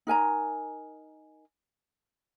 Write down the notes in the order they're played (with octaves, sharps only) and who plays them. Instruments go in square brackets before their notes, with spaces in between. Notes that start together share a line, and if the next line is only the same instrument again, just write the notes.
[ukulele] D#4 A#4 G#5 A#5